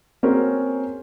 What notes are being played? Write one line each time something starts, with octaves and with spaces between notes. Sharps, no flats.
A#3 C4 C#4 F#4 G#4 A#4